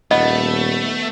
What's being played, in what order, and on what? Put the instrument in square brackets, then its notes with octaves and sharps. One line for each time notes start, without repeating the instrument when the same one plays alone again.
[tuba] D#1 [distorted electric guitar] A3 [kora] B3 [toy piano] D#5